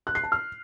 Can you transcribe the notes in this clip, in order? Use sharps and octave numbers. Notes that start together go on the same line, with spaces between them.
F#6
C7
A5
F6